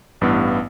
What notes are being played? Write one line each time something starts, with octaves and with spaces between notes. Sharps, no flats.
A1 G2 E3 B3